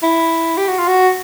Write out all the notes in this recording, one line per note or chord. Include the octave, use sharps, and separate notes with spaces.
E4
G4
F#4
F4
F#4